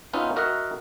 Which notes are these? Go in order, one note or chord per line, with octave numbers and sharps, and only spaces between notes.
B3 C#4 D#4 F4 E5
F#4 A#4 D#5 E5 F#5